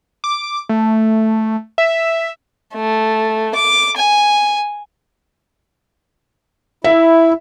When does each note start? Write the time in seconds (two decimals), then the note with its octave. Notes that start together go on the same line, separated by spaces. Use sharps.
0.24 D6
0.69 A3
1.78 E5
2.74 A3
3.55 D6
3.96 G#5
6.84 E4 E5